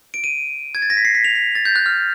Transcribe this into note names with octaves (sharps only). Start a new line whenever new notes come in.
D7
D#7
G#6
A6
A#6
B6
C7
B6
F7
B6
A6
G6
F#6
F6